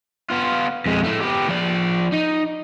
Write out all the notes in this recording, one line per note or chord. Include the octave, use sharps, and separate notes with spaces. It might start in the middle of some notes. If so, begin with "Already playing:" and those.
B3 F4
F2 G#3
A3 E4
B3 G4
F3 D5
D#4